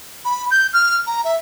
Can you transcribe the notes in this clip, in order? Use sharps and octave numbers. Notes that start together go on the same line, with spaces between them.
B5
G6
F6
A#5
E5